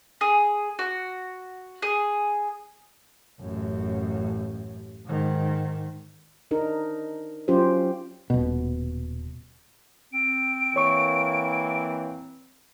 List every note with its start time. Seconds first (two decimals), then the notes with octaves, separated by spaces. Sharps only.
0.21 G#4
0.79 F#4
1.82 G#4
3.40 A1 F#2
5.06 G#2 D#3
6.51 D4 D#4 A#4
7.48 F#3 C#4 F4 G4 C5
8.30 D#1 B2
10.13 C4 D7
10.76 E3 A#3 C#5 C#6